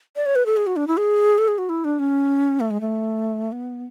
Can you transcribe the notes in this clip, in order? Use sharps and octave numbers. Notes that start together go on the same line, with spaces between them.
D5
C#5
B4
A4
G#4
F#4
D4
E4
G#4
A4
G#4
F#4
E4
D4
C#4
A3
G#3
A3
B3